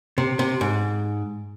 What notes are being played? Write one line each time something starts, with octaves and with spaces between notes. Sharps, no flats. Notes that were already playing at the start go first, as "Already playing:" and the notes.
C3
C3
G#2